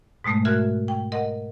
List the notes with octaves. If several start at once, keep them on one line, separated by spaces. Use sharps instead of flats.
G#2 B2 G#3 A3
F#4 A#4 E5 F6 F#6 G#6
G5
A#4 D#5 F#5